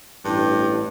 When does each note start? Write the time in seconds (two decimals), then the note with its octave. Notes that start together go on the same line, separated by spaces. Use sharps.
0.25 A1 G2